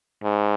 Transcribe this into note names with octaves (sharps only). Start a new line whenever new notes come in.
G#2